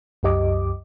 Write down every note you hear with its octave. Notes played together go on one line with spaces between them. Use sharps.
C2 F#2 G4 D#5 D6